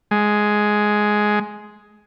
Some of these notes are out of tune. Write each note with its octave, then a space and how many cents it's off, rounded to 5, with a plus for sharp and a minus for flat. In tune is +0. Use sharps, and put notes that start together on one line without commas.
G#3 +5